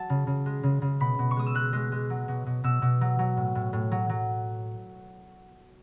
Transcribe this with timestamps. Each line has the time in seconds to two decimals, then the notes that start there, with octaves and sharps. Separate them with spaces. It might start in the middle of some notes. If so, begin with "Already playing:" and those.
Already playing: F#3 A5
0.10 C#3
0.27 C#3
0.46 G#3
0.63 C#3
0.82 C#3
1.00 B2 B5
1.19 B2
1.31 C#6
1.36 G#3 D#6
1.46 E6
1.54 G#3 F#6
1.73 G#3
1.92 G#3
2.10 F#3
2.28 B2
2.46 B2
2.64 B2 E6
2.82 B2
3.01 F#3
3.19 F#3
3.37 A2
3.55 A2
3.73 A2
3.91 F#3
4.09 F#3